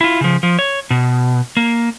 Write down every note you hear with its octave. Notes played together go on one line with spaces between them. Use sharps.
E4 F4
C#3 F3
F3
C#5
B2
A#3